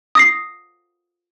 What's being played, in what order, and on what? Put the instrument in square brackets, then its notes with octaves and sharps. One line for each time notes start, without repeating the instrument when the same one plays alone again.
[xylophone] D#6 A#6 C7